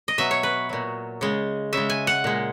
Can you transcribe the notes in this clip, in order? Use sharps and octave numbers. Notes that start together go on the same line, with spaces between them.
D#5
B2 F#3 E5
C#5
B4
A#2 F#3
C#3 G#3
C#3 G#3 E5
G#5
F#5
A#2 G#3